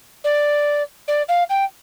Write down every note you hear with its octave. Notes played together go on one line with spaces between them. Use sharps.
D5
D5
F5
G5